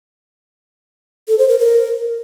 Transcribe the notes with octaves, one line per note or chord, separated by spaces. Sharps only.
A4
C5
A#4
A#4